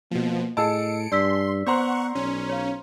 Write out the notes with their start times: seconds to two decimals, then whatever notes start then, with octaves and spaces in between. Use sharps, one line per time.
0.11 B2 F3 A#3
0.57 A2 G#4 D#5 A5 E6 C#7 D7
1.12 G2 D5 C6 E6 B6
1.66 B3 C5 F#5 A#5 C6 C#6
2.15 B1 C#4
2.49 C#5 F5